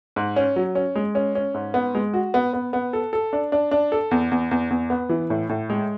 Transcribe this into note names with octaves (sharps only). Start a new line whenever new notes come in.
G#2
C#4
F#3
C#4
G#3
C#4
C#4
G#2
B3
G#3
F#4
B3
B3
B3
A4
A4
D4
D4
D4
A4
E2
E2
E2
E2
B3
E3
A2
A2
G#3